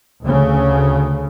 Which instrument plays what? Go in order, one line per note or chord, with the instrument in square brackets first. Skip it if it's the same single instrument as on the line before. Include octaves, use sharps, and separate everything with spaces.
[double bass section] D2 C#3